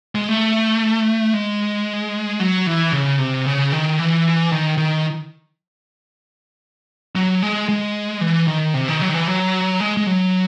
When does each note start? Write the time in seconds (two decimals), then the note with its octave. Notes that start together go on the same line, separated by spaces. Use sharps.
0.15 G#3
0.29 A3
1.34 G#3
2.40 F#3
2.67 E3
2.93 C#3
3.19 C3
3.46 C#3
3.72 D#3
3.99 E3
4.52 D#3
4.78 D#3
7.16 F#3
7.42 G#3
7.69 G#3
8.21 E3
8.48 D#3
8.74 C3
8.88 D#3
9.02 F#3
9.09 D#3
9.14 E3
9.27 F#3
9.80 G#3
9.97 G#3
10.07 F#3